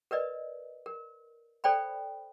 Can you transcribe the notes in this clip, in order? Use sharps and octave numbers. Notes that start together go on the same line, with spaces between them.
A#4 B4 D5 D#5
A#4
A4 C5 D5 G5 B5